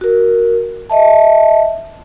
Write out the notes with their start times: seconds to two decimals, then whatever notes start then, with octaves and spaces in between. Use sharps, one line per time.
0.01 F#4 A#4
0.90 D#5 E5 A5